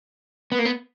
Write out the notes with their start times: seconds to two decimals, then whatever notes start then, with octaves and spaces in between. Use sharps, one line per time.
0.52 B3
0.59 A#3
0.65 B3